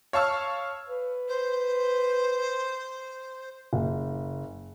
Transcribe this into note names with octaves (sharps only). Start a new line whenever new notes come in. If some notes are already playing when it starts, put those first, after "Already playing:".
C#5 F5 A5 C#6 E6 F6
B4
C5
F#1